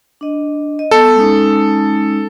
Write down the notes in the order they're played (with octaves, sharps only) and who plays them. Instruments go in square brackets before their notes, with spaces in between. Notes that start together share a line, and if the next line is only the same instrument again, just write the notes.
[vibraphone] D4 D#5
D#5
[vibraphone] B3 [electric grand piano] A4
[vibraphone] G#3 C#4 D#4